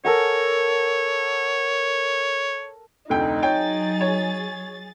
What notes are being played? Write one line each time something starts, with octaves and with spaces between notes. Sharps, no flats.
A4 A#4 C#5 F#5
F1 D2 D#4 G5
F#3 G#4 C#5 G5 A6
C#5